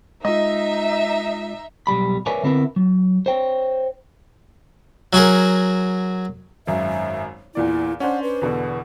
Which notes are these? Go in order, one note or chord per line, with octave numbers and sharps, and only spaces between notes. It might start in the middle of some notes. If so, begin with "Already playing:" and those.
G#3 D#4 F4 D#5 E5
B1 E2 G3 B5
A#4 B4 C#5 D5 E5 G#5
D3 B3 C4 E4 A#4 B4
F#3
C5 C#5 G5
F#3 F#4 G#4 A#4
G#1 F#2 E5
E2 A#2 E4 D5
C#4 D4 C5 F#5
B4
E2 B2 D3